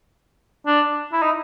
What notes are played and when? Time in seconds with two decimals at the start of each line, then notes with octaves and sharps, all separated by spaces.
0.66 D4
1.13 E4
1.22 D#4